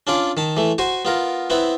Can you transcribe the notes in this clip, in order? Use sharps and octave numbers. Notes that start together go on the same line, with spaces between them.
C#4 D4 F4 D5
D#3 A5
E3 A3
F#4 C5 G#5 C#6
B3 F4 A#4
B3 C4 E4 B4